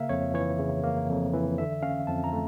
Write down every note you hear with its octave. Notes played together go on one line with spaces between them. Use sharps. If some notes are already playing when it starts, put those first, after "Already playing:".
Already playing: C#3 A#3 E5 F5
F2 C#5
E3 C#5
C#3
A#3
F2
E3
D3 E5
C#4 F5
F2 A5
A#5
A3